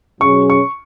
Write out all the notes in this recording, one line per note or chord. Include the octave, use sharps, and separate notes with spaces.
B2 F#3 C#4 G#4 C#6
C#6